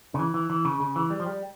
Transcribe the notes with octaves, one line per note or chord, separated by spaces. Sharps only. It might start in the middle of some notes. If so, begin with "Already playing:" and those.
C#3
E3
E3
E3
C#3
C#3
E3
G3
F3
G3